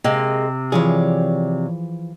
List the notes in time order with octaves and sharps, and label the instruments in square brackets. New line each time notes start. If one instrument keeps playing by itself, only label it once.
[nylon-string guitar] C3 [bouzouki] G#3 A#3
[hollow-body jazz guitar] E3 F3 G#4 [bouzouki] C#5 D5